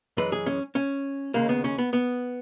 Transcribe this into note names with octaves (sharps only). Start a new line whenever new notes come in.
F#2 E3 G#3 B4
G#4
C#4
C#4
D#2 C#3 G#3 A#3
B3
C#4
B3
B3